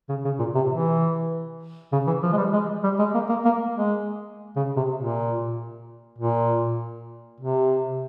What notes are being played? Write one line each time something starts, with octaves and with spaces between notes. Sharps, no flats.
C#3
C#3
A#2
C3
E3
C#3
E3
F3
G#3
G3
G#3
G3
G#3
A#3
A#3
A#3
G#3
C#3
C3
A#2
A#2
C3